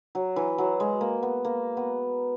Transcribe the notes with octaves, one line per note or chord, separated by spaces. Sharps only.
F#3
E3
F#3
G#3
A#3
B3
A#3
B3